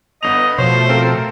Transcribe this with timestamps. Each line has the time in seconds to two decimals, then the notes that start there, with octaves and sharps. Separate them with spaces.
0.23 G1 B3 D#5 F7
0.58 B2 F3 A3 C5 C#5
0.89 C4 A4 A#4